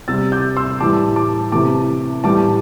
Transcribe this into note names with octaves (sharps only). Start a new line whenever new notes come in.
C3 G3 E6 A6
D6 G6
C6 E6
A2 E3 G3 A5 D6
A5 D6
C3 E3 A3 A5 D6
A2 E3 G3 A5 D6